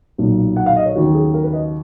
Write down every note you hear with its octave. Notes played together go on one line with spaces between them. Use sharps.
B1 A#2 F#3
F#5
F5
D#5
C#5
D#2 C#3 F#3 F#4
G#4
A#4
B4
D#5